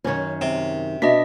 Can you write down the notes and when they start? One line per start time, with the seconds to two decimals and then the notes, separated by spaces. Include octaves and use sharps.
0.04 F#2 D#3 C#4 C#5
0.41 C3
1.02 B2 D4 D#5 E5 B6